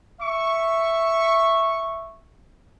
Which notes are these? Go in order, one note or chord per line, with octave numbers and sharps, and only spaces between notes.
E5 C#6